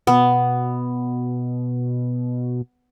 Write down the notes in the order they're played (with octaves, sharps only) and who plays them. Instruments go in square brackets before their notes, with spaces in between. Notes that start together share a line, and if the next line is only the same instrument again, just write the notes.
[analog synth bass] B2 [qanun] B3